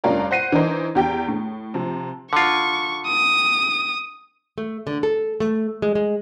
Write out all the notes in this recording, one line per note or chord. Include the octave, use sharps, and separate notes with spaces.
F1 G2 C#4 F4 A#4 D5
C5 F#5 C7 D#7
E3 D4 D#4 A#4 C5
E2 G4 G5
A2
C3 F3
D3 F4 C#6
D#6
A3
D3
A4
A3
G#3
G#3